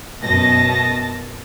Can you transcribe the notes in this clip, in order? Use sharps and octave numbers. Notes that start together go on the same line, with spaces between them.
F#2 B2 D#5 A5 A#6